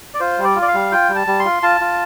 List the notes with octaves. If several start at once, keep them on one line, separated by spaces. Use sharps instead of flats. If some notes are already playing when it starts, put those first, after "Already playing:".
D5
F4 C5
G3
D5
F4
D5
F5
G3
F4 G5
G3
A5
G3
C6
F4
F4 A5
F4